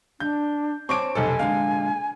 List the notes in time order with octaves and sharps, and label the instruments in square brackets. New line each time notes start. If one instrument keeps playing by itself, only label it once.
[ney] D4 [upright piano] G6
[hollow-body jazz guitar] C4 C#5 [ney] A5 [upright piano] C#6 D6 D7
[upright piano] F1 B1 A4 [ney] G#5
[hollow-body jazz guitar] A#2 D3 G#3 [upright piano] F5